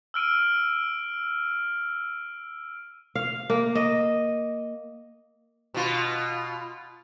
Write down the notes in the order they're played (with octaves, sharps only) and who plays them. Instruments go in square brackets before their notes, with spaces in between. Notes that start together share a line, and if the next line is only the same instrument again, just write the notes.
[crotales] E6 F6 D7 D#7
[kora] F5
A#3
D#5
[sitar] B2 F4